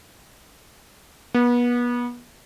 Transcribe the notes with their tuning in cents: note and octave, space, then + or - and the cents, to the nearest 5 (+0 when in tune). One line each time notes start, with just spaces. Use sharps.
B3 -30